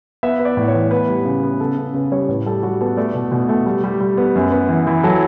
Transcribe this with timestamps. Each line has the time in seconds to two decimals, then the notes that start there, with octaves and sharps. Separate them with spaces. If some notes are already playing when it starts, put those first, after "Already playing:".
0.23 B3 E5
0.39 B3
0.45 D5
0.57 A2
0.68 C#5
0.74 E3
0.91 B3 B4
1.09 G3
1.25 C#3
1.43 B3
1.59 C#3 A4
1.77 C#3 A4
1.94 C#3 B4
2.12 G3 C#5
2.28 A2 B4
2.46 G3 A4
2.63 G3 F#4
2.81 B3 A4
2.97 A3 D5
3.14 B2
3.32 B2
3.49 A3
3.66 G3
3.84 G3
4.01 G3
4.17 B3
4.36 F#2
4.52 B3
4.69 E3
4.87 E3
5.04 F#3 A4